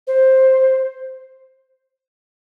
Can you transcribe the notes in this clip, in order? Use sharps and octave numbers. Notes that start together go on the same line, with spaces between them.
C5